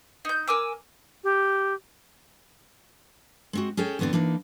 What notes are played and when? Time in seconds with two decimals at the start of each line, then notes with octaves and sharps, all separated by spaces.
0.25 D#4 G6
0.48 A#4 G#5 D6 E6
1.24 G4
3.53 G#3 C4 F#4
3.77 C#4 G#4 A4 C#5 G5
3.99 E2 D3 B3 C4 D5
4.13 E3 A#3 D4 D#4